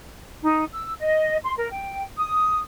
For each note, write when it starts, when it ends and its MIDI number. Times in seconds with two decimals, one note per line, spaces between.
0.44 0.64 63
0.73 0.94 88
0.99 1.36 75
1.44 1.53 84
1.57 1.69 70
1.71 2.04 79
2.19 2.59 87